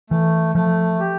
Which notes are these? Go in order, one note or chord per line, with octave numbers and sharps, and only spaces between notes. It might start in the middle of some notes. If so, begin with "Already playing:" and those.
E3 A3
F3 A3
G4